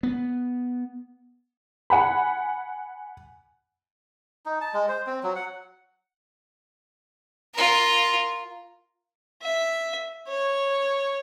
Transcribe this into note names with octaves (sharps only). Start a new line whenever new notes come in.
B3
F#5 G#5 B5
D#4
A5
G#3
C5
C4
F#3
F#5
F4 A#4
E5
C#5